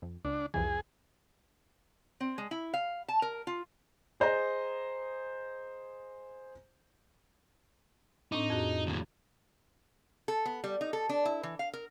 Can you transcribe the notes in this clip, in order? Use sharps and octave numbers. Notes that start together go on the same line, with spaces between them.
F2
C#2 D4
C2 F2 E3 G#4
C4
G#3
E4
F5
A5
A#4
F4
G#4 C5 D#5 A#5
A2 C4 D4 D#4
F2 F#4 G#4
D#2 A2
A4
B3
G3
D#4
A4
D4
E4
E3
F5
A#4